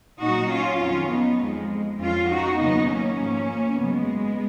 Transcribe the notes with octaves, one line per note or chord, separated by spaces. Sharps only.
A#2 F#3 D#4 F#4
C#4 F4
F2 D#3 F#3 C#4 F4
B3 D#4
F2 F3 G#3
F2 F3 C#4 F4
D#4 F#4
D#2 C#3 F#3 B3 D#4
A#3 C#4
G#2 F3
F#2 C#3 F#3 G#3 B3